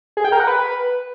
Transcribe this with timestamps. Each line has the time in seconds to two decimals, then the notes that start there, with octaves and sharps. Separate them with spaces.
0.17 G#4
0.25 G5
0.32 A#4
0.40 F#5
0.47 B4